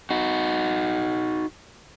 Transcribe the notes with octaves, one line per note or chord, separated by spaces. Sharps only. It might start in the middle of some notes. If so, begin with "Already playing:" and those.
D#4 F#4